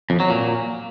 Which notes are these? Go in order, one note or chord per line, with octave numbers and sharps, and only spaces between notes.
F2
F#3
A#2